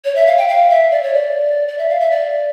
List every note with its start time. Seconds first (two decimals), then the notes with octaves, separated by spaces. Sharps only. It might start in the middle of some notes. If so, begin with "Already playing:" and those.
0.05 C#5
0.15 E5
0.26 F5
0.37 G5
0.48 F5
0.70 E5
0.91 D5
1.03 C#5
1.14 D5
1.68 D5
1.78 E5
1.89 F5
2.00 E5
2.11 D5